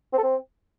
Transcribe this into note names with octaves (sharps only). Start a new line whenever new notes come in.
C4
A4
C4